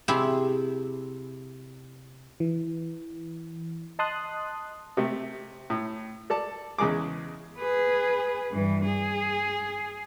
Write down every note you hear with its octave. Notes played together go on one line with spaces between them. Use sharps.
C3 E4 G4 G#4
E3
D#5 A5 C6 D#6 F#6
C3 A3
A2
A4 D5 A5
E2 C#3 G#3 G#4 D6
G#4 B4
G2 E3
G#4